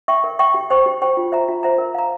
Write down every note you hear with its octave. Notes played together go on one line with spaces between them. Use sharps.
E5 G5 C#6
A#4
E5 G5 C#6
G4
C5 G5 C#6
G4
C5 G5 C#6
F4
C5 E5 A#5
F4
C5 E5 A#5
A#4
F5 A#5